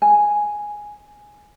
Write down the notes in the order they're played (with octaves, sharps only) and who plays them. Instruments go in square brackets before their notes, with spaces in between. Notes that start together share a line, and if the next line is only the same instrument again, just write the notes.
[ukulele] G#5